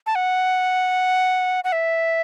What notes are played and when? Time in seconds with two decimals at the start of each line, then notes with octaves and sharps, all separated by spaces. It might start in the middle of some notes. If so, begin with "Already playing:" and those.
0.07 A5
0.15 F#5
1.64 F#5
1.72 E5